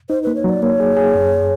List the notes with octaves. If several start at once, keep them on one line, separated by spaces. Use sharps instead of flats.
D#4 C5
A#3 B4
C#5
F#3 D5
A#3 C#5
G#4
G#4
F#2